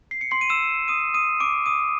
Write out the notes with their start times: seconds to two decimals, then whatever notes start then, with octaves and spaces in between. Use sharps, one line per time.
0.11 C7
0.21 C#7
0.31 C6 C7
0.41 D#7
0.50 E6 E7
0.88 D#6 D#7
1.14 D#6 D#7
1.40 D6 D7
1.66 D#6 D#7